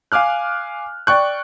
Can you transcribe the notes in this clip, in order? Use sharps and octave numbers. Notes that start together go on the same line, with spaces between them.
F5 G#5 D6 F6 F#6
D5 G5 C#6 F#6